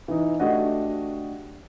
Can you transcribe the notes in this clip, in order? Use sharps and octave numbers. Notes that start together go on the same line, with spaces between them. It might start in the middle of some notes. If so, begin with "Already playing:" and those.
E3 D#4
A3 D4 F#4 G4 D#5 F#5